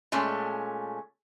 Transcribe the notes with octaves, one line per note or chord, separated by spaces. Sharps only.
A#2 G#3 A3 C#4